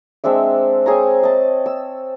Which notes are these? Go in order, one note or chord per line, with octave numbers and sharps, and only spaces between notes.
G#3 C4 D4 E5
C4 G#4 C#5 A#5
D#5 A5
E6